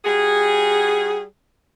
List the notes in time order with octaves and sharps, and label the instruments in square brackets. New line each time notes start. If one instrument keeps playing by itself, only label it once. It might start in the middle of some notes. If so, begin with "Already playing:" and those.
[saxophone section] G3 F#4 G#4